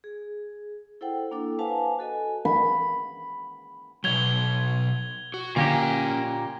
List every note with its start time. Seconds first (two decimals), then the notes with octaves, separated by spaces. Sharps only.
0.04 G#4
1.01 E4 A4 C5 F#5 G5
1.31 A#3 D4 E4 A4 D6
1.59 B4 C5 F5 F#5 G#5 A5
1.99 F#4 A4 D#5 G#5
2.45 B5
4.04 B2 F#3 G#6 F7 G7
5.34 F#4
5.56 A#2 D3 A#3 C#4 G4 G#5 A#5